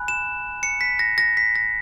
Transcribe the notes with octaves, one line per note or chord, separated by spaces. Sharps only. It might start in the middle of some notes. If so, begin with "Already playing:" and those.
Already playing: G#5 B5 F#6
E7
C#7
B6
A#6
A#6
B6
A#6